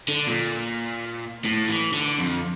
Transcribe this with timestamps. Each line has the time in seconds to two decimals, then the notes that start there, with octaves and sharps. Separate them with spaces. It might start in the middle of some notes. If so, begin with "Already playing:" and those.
0.08 D3
0.27 A#2
1.45 A2
1.68 E3
1.93 D3
2.18 F2